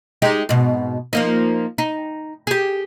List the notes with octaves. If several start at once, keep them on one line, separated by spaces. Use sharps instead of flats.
G#3 D#4 G4
G#2 B2
F3 A#3 D#4
D#4
G4 G#4